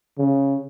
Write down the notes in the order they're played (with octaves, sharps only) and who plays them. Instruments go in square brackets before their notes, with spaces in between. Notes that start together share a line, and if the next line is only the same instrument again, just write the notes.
[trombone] C#3